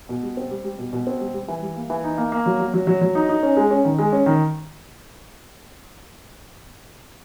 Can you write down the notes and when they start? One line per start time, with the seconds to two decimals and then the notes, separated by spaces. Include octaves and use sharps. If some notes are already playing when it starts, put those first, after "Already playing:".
0.09 B2
0.23 G3
0.37 C4
0.51 G3
0.65 G3
0.79 B2
0.93 B2
1.07 C4
1.21 G3
1.34 G3
1.48 E3
1.62 G3
1.76 A#3
1.90 E3
2.04 D#4
2.18 A#3
2.32 A#3
2.46 F#3
2.60 F#3
2.74 F#3
2.87 F#3
3.01 F#3
3.15 D#4
3.29 D#4
3.43 C#4
3.57 G#3
3.71 C#4
3.85 D#3
3.99 G#3
4.13 C#4
4.26 D#3